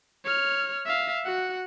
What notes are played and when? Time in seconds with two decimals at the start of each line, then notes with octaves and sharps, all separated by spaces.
0.25 C#5 F6
0.86 E5 F5
1.25 F#4 F#5